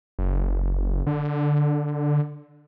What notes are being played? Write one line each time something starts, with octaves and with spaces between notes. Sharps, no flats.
F#1
D3